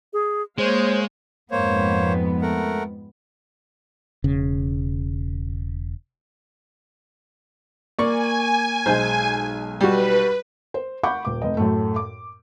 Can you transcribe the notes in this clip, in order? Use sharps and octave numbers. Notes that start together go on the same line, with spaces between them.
G#4
G#3 A#3 C5 C#5 F5
F2 G#2 A#3 B3 C5 C#5
A3 A#4 F#5
E1 C#3
A#3 D5 G#5 C#6
B1 G#3 C5
G3 F#4 B4
C5
F#5 B5 C#6 D6 G6
D#1 D6
F1 D#5
F#2 A2 A3
D6